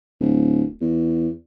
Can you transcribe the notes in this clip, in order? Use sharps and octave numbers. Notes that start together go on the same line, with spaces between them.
D1
E2